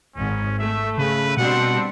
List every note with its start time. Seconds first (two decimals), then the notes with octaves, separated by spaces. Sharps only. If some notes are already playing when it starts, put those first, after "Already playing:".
0.15 G#1 G#2 C#4
0.58 A3 E5
0.98 C#3 B4
1.37 B2 G3 C4 D4 F#5